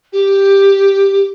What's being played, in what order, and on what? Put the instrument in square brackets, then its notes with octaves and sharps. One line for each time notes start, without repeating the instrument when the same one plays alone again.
[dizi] G4